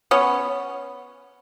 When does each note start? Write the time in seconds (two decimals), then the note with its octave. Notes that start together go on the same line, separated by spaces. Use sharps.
0.11 B3 C#4